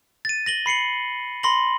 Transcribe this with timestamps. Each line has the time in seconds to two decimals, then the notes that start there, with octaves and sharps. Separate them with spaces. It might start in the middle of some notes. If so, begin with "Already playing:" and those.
0.25 A6 D#7
0.46 A#6 F#7 G7
0.66 B5 C7 C#7 F#7
1.43 B5 C6 A#6 F#7